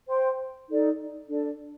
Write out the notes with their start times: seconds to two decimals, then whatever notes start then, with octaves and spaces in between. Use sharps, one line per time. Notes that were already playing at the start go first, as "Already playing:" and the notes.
0.08 C5 G5 C6
0.68 D#4 A4 D5
1.28 D4 A4 D5